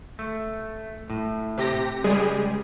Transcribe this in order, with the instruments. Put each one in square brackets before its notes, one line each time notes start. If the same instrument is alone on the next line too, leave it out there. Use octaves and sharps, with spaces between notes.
[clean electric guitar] A3
A2
[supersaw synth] C3 G4 A#6
[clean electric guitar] C#2 [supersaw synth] G3 G#3 G#4